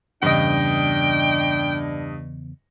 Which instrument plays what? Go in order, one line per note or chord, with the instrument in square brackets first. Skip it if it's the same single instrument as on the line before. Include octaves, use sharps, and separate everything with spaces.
[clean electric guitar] E2 C#3 [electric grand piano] G2 D#5 [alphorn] D4 [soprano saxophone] G5